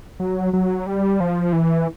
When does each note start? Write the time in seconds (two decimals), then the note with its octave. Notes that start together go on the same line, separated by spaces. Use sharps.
0.20 F#3
0.53 F#3
0.86 G3
1.20 F3
1.53 E3